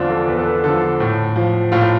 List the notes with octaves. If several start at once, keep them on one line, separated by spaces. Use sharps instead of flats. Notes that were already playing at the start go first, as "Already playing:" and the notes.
Already playing: E2 D3 F3 C4 D4 F4
A4
E2 B4
A4
B4
D3 F3 A4
A2
F3
A2 F4